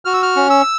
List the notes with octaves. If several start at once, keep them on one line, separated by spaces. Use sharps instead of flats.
F#4 F6
E6
F6
C#4
E6